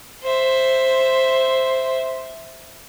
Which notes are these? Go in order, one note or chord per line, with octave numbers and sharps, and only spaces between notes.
C5 E5